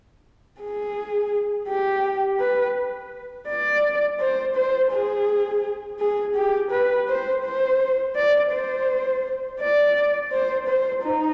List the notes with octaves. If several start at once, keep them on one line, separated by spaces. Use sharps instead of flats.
G#4
G4
B4
D5
C5
C5
G#4
G#4
G4
B4
C5
C5
D5
C5
D5
C5
C5
D#4